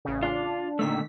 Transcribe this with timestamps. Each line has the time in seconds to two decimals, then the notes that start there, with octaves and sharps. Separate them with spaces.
0.05 A1 C#3
0.23 D4 F4
0.79 A#2 D3 D#3 A3 B6